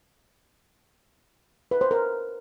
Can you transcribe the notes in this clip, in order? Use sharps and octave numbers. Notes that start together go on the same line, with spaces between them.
B4
C5
A#4